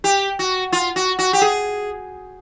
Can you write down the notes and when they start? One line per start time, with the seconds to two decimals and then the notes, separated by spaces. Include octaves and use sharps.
0.04 G4
0.39 F#4
0.72 F4
0.96 F#4
1.19 F#4
1.33 G4
1.41 G#4